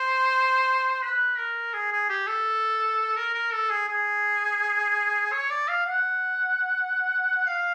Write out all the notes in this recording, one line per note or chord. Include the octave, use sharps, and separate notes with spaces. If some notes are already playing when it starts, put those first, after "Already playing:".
Already playing: C5
B4
A#4
G#4
G#4
G4
A4
A#4
A#4
A4
G#4
G#4
C#5
D5
F5
F#5
F5